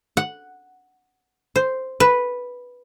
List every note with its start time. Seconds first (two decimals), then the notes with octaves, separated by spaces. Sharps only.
0.17 F#5
1.56 C5
2.00 B4